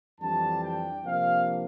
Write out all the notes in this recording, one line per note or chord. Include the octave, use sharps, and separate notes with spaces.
F2 E3 G3 D4 A5
G5
C3 F3 A#3 D4 F5